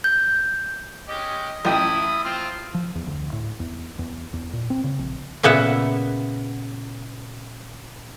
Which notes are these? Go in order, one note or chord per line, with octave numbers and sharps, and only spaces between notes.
G6
G#3 C#4 G4 D#5
A1 E4 G5 D#6
C4 F4
F3
E2
D2
A2
E2
E2
E2
A#2
C4
C#3
A#1
A#2 C#3 B3 B4 E5 F#5